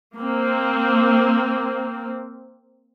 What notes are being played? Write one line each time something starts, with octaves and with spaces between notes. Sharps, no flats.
A#3 C4